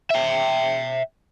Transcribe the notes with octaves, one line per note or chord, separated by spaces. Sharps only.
E5 G5